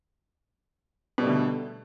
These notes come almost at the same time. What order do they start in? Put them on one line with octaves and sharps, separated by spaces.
B2 G3 A3 D3